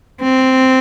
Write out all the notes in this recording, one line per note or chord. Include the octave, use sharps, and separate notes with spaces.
C4